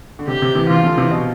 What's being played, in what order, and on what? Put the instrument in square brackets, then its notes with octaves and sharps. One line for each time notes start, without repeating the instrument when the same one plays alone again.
[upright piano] D3
[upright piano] C3 [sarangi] G4
[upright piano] C3
C3 E3
[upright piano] C3 E3 [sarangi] F4
[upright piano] D3 F3
C3 E3
B2